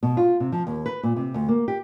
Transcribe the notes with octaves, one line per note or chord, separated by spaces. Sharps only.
B2
F4
C3
F3
D#2
B4
A#2
C3
D2
A#3
G4